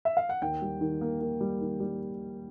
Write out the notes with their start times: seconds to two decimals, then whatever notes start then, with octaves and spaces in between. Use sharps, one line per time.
0.05 E5
0.17 F5
0.29 F#5
0.42 D#2 G5
0.62 G3
0.81 D#3
1.01 A#3
1.21 A#3
1.41 G3
1.61 D#3
1.80 G3